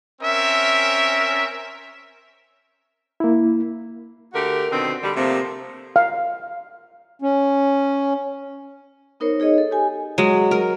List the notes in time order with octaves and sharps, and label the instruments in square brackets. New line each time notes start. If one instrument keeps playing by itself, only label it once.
[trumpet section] C4 C#4 A#4 E5
[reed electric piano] A#3 E4
[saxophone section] D3 A3 F#4 G4 A#4
B2 D3 D#3 C4 D4
D3 G3
C3 F3 A3 A#3 C4
[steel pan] F5
[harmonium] C#4
[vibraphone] B3 D#4 A#4 C5 C#5
D#4 G#4 C#5 D#5
A4
G4 G#5
[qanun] F#3 G#3
A#4